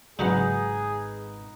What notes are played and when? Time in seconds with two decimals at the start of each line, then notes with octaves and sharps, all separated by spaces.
0.19 G#1 C#3 F#3 B3 C#4 D#4 G#4